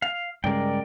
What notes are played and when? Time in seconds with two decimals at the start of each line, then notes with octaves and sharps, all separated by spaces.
0.02 F5
0.44 G2 C#3 G#3 A#4 D5 G5